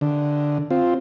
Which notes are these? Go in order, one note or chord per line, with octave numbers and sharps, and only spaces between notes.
D3
C4 F4